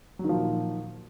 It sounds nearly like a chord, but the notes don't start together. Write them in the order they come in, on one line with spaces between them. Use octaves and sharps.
F#3 D#3 F3 A#2